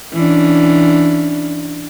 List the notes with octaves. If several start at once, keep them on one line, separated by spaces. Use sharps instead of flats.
E3 C#4 D4